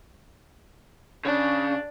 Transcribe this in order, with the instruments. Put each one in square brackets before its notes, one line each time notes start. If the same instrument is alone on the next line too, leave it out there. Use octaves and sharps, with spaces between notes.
[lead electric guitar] C#3 [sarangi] D4